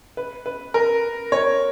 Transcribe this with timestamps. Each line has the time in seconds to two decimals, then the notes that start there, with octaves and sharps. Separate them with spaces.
0.17 B4
0.46 B4
0.74 A#4
1.32 C#5